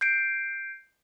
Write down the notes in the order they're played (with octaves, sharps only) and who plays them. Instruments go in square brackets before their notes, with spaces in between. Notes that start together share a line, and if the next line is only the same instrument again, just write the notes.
[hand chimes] G6 C7 D7